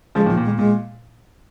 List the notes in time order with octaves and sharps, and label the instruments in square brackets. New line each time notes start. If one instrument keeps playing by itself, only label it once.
[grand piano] C#3 F3 [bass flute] G#3
[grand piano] A#2 D#3
[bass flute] F3
[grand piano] A#2
[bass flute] G#3
[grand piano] A#2
[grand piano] A#2 [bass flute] G#3